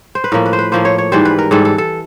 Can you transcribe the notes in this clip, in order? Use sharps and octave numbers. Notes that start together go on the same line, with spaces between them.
C5
B4
A2 F3 A#3 A#4
B4
C5
B4
A2 F3 A#3 C5
C#5
C#5
G#2 E3 G3 C5
B4
A#4
G#2 E3 G3 A4
A4
A4